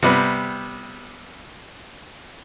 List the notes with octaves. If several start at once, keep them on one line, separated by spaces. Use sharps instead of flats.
C3 G3 B3